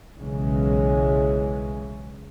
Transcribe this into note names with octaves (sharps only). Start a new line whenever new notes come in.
B1 C#3 E3 G#3 C#4